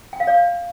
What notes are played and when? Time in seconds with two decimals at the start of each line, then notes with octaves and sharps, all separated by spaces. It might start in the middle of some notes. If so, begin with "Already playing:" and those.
0.13 G5
0.20 F5
0.27 D5